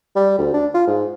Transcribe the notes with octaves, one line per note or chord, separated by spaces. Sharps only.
G3
D2
D4
F4
G#2